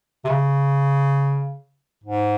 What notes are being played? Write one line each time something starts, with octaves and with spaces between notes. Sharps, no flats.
C3
C#3
G#2